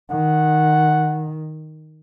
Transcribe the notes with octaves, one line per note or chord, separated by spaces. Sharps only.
D#3 F#5